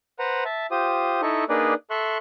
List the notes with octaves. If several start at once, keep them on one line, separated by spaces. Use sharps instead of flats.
B4 C5 F#5 A#5
E5 A5
F4 G4 C5 D#6
D#4 E4 A4 C#6
A#3 D4 D#4 G#4 B4 D5
A4 E5 C6 C#6 F#6